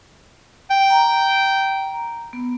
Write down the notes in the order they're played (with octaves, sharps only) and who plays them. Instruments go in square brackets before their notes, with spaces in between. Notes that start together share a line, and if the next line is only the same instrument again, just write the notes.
[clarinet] G5
[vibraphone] A#5
B3